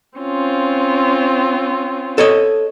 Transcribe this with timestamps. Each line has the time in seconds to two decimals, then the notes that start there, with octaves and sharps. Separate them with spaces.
0.18 C4 C#4 F4
2.18 A4 C#5 D#5